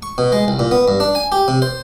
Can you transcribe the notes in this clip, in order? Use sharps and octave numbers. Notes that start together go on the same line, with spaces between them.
C#6
B2
G#3
C2
A#2
B3
G2
D4
G#5
G4
C3
C5